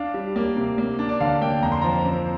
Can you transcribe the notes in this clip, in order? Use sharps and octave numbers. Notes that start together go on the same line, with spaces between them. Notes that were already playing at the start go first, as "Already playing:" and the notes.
Already playing: D4 F5
G3
A#3
C3
A#3
D4
D5
D3 F5
A#3 G5
F2 A#5
C6
F3 A#5
C4